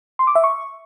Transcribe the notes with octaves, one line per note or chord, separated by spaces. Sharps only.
C6
D6
E5
C#6